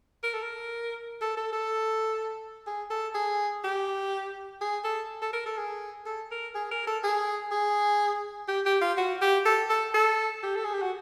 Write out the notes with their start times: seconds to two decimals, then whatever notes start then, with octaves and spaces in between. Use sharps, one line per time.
0.23 A#4
0.34 A4
0.43 A#4
1.22 A4
1.37 A4
1.53 A4
2.67 G#4
2.90 A4
3.15 G#4
3.64 G4
4.61 G#4
4.84 A4
5.22 A4
5.33 A#4
5.46 A4
5.58 G#4
6.06 A4
6.31 A#4
6.55 G#4
6.71 A#4
6.87 A4
7.04 G#4
7.52 G#4
8.48 G4
8.66 G4
8.81 F4
8.97 F#4
9.22 G4
9.45 A4
9.70 A4
9.94 A4
10.43 G4
10.56 A4
10.65 G#4
10.74 G4
10.82 F#4